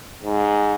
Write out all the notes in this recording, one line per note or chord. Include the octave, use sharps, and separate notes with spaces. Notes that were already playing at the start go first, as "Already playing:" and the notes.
G#2